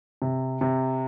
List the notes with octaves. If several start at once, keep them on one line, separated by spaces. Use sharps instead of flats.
C3
C3